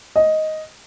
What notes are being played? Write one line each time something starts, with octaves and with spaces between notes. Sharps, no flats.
D#5